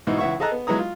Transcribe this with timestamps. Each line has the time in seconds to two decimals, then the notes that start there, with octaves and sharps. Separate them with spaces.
0.07 G#2 B2 E3 D#4 E4
0.18 C#2 E3 E5 F#5 C#6
0.40 G#4 A4 D#5 A5 A#5 F#6
0.52 B3
0.67 F#3 G#3 B3 E4 A#5 D#6
0.79 F4